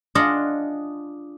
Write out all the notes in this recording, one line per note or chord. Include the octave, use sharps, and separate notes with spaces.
D4 F4 G#4 D#5 F#5